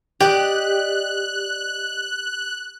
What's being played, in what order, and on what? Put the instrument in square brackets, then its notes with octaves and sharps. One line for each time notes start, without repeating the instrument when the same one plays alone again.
[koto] G4 [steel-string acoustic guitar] D5 D#5 [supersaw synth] F#6